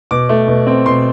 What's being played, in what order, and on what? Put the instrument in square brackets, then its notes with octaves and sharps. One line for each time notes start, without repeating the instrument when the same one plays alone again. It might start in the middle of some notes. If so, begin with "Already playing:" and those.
[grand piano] B2 D6
A3
B2
C4
B2 C6